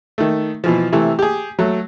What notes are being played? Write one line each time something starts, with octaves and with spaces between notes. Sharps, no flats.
D#3 A3
B2 E3 F3
C3 E3 A3
G4 G#4
F#3 A3